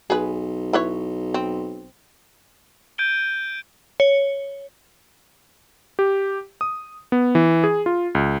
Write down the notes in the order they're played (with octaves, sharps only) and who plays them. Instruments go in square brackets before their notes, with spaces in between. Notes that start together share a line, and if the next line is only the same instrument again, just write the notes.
[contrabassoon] B1 [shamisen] G#4 B4
[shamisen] E4 B4 C#5
C4
[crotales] G6 G#6 D7 D#7 G7
[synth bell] C#5
[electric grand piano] G4
D#6
B3
E3
G#4
F4
C#2